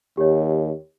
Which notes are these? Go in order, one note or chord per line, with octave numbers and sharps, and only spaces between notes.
D#2 G4 C#5